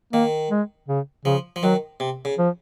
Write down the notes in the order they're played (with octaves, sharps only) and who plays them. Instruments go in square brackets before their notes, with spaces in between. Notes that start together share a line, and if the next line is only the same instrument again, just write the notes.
[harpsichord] D#3 [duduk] A#3
[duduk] G#3
C#3
[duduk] C#3 [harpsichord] F3
[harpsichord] F3
[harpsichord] D#3 [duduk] F#3
[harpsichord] C3
C#3
[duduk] F3